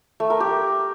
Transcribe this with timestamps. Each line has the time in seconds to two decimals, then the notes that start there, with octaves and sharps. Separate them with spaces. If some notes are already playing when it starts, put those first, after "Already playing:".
0.20 A3
0.30 A#4
0.40 G4